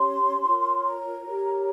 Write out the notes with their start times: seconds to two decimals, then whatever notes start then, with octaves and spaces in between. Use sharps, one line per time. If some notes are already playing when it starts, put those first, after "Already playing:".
Already playing: C#4 G4 C#5 C6
0.46 F4 A#4 C#5
0.85 A#5
1.25 G4 A#4 C#5